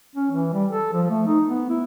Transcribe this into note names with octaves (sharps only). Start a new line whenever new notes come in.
C#4
E3
G3
A4
F3
A3
D#4
B3
E4